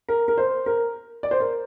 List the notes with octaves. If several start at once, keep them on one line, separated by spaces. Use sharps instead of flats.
A#4
A#4
C5
A#4
D5
C5
A#4